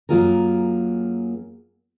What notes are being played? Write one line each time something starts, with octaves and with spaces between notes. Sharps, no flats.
F#2 F#3 A#3 F4 G#4 A#4